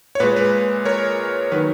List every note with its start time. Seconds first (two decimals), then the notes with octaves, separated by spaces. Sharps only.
0.15 C#5
0.20 A#2 G#3 B4
0.36 B4
0.85 A#4 C#5
1.52 D#3 F#3 B4